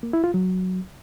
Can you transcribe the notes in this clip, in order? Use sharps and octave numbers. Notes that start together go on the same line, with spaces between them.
A#3
E4
F4
F#3